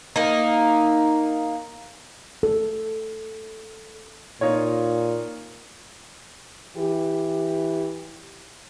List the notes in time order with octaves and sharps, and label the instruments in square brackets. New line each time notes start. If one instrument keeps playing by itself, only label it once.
[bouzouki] A#3 D#4
[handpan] A4
[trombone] A#2 [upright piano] D#4 F4 C#5
[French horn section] E3 G4